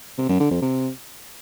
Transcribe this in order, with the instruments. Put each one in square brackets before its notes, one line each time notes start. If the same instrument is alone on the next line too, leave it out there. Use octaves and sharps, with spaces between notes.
[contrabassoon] C3
F#2
D3
F2
C3